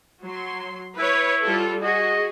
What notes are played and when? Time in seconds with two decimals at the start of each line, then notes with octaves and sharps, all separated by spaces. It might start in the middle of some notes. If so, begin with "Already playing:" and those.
0.24 F#3 C6
0.98 E4 B4 C#5
1.43 G3 F4 A4
1.83 F#4 G#4 D#5